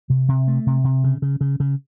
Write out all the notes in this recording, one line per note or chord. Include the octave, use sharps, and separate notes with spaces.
C3
C3
A3
C3
C3
C#3
C#3
C#3
C#3